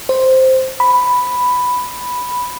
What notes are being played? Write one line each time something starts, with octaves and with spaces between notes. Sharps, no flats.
C5
B5